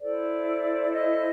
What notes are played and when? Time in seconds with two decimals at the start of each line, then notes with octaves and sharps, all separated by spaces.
0.01 E4 A4 C5 D5
0.92 D#5